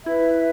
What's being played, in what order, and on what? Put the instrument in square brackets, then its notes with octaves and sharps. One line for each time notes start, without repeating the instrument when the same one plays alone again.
[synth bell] E4 [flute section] B4 E5